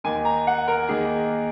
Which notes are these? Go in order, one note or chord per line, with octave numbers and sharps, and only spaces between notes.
D#2 D#3 A#3 G#5
A#5
F#5
A#4
D#2 D#3 A#3 G#4